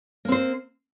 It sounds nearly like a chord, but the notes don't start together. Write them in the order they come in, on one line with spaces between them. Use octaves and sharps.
A#3 C4 C5